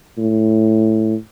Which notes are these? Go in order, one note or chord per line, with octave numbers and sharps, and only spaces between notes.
A2